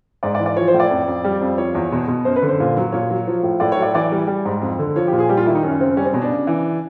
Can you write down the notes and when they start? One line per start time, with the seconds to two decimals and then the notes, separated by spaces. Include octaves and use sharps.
0.23 G#2 D5
0.35 D5
0.39 E3
0.46 D5
0.56 F3 C#5
0.68 C5
0.74 A2
0.80 D5
0.91 F2
1.08 F2
1.24 G3
1.41 F2
1.58 F3 C#5
1.75 E2
1.92 B2
2.08 B2
2.25 F#2 C5
2.36 B4
2.43 D3
2.48 C5
2.60 A#2
2.77 F#3
2.92 A#2 C#5
3.10 F#3
3.27 F3
3.43 A2
3.60 A2 D5
3.72 C#5
3.77 F#3
3.82 D5
3.94 E3 D5
4.12 G3
4.27 G3
4.45 G#2
4.62 F2
4.79 D3
4.96 F3 C#5
5.07 G4
5.12 A#2
5.19 G#4
5.29 G3 G4
5.37 F4
5.46 D#3 E4
5.55 D#4
5.63 F#2 C#4
5.79 C#3 C4
5.97 G3 C#4
6.05 C4
6.13 B2 C#4
6.21 D4
6.30 C#3
6.47 E3